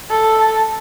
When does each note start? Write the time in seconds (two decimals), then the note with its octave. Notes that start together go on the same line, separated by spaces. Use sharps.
0.11 A4